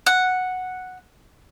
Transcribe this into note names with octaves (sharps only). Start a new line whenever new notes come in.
F#5